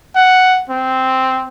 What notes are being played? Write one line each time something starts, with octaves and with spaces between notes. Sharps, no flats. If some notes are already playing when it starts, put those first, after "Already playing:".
F#5
C4